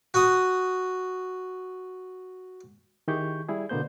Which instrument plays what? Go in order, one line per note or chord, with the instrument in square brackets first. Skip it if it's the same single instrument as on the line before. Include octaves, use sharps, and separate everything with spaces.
[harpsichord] F#4 D#6
[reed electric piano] D#3 E4 G4 G#4 C#6 G6
G3 E4 G#4
B2 D3 A#3 B3 C5 G6